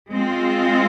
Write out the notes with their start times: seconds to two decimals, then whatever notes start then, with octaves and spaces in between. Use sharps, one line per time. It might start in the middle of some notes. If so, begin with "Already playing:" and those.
0.14 G#3 C4 F4